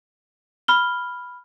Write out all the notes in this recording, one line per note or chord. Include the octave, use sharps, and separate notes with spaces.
B5 F6 G7